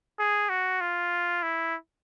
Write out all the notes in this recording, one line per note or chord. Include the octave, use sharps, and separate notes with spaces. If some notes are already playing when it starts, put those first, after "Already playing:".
G#4
F#4
F4
E4